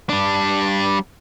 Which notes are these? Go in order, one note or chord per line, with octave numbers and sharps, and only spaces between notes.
G3 D4